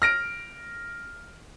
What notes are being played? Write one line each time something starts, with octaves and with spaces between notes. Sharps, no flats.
F6 A#6 D7